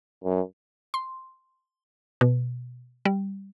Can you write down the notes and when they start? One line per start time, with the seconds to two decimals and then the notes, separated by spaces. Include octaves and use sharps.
0.24 F#2
0.94 C6
2.21 B2
3.05 G3